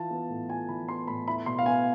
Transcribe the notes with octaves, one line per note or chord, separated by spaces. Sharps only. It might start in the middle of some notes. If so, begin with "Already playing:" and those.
Already playing: E3 F4 A5
B3
A2
F4 G#5
E3 B5
B3 C6
A2 B5
E4 B5
B2 C6
F5
B3 G#5